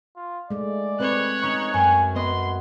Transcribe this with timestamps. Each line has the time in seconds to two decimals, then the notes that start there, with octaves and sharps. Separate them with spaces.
0.16 F4
0.50 G#3 A3 D5
1.00 C4 B4 C#5 F#6
1.42 C#4 D#4 C#6
1.74 F#2 G5 G#5
2.16 B3 B4 D#5 C6